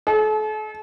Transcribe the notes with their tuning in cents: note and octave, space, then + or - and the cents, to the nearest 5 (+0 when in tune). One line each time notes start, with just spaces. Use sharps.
A4 -40